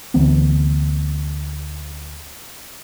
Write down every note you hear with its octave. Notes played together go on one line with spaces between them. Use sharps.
D2 E3 B3 C4